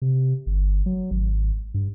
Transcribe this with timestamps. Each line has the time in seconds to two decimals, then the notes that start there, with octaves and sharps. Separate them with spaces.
0.02 C3
0.46 G1
0.86 F#3
1.11 G#1
1.74 G2